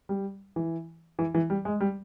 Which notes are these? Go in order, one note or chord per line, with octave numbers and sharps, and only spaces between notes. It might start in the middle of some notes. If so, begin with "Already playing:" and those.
G3
E3
E3
E3
G3
G#3
G3